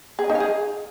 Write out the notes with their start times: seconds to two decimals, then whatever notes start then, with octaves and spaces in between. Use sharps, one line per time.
0.19 G#4
0.24 D#5
0.30 D#4
0.35 F5
0.40 G#4